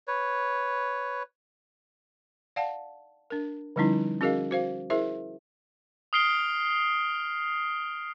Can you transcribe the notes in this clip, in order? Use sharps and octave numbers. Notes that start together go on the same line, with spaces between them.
B4 C#5
D5 F5 F#5 A5
D4 A#4
D3 F3 G3 C#4 D#4 E4
C#4 F#4 G#4 A#4 D#5 F5
F#4 C5 F5
E4 G#4 A#4 C5 E5
D#6 F6 C7 D7 G7